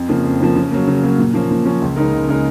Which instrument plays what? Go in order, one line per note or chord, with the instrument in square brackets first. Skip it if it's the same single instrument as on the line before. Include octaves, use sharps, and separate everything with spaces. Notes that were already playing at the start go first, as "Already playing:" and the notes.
Already playing: [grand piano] F2
C#3 F3 A#3
F2
C#3 F3 A#3
C#3
F#3 A#3
C#3
F#3 A#3
A#2
F3 A#3 C#4
A#2
F3 A#3 C#4
C#2
C#3 G#3 D#4 A#4
C#2
C#3 G#3 D#4 A#4